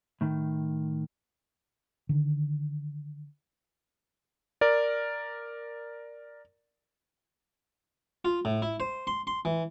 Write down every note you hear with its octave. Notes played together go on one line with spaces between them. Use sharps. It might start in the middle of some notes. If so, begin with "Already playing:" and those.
A2 D#3
D3 D#3
A#4 D5
F4
A2
E4
C5
C6
C6
E3